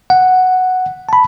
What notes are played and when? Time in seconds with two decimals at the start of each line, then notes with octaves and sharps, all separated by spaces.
0.10 F#5
1.09 A5 B5